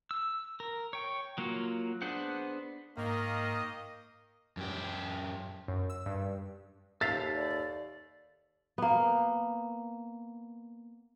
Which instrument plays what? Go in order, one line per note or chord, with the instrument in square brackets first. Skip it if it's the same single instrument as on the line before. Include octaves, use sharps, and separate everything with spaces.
[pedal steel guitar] E6
A#4
C#5 G5
F#3 A#3 F4 F#4
B3 D4 G#4 C5 F#5
[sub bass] G#2 [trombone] D#3 [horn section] A#3 [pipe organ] D#5
[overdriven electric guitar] F#2 G4
[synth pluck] F#2
E6
G2
[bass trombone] D#2 [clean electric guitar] A4 E5 F5 [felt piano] A6
[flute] D5
[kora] A#3 B3